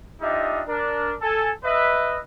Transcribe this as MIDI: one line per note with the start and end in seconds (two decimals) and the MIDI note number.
0.21 0.62 62
0.21 0.62 63
0.21 0.62 65
0.21 0.62 67
0.21 0.62 75
0.21 0.62 76
0.68 1.15 62
0.68 1.15 70
1.22 1.51 69
1.22 1.51 80
1.65 2.19 71
1.65 2.19 75
1.65 2.19 76